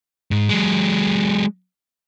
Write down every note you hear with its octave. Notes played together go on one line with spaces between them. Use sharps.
G#2
F#3 G#3